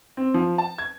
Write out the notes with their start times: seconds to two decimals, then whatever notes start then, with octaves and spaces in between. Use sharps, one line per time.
0.17 C4
0.34 F3
0.58 A5
0.78 G#6